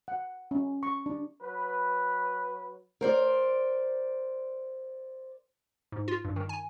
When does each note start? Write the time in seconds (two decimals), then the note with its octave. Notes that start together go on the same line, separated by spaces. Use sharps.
0.08 F#5
0.51 C#4
0.83 C#6
1.06 D4
1.42 F#3 B4
3.01 A#4 C5 D5
5.92 G#2
6.08 F4
6.25 G2
6.36 D#3
6.49 G#5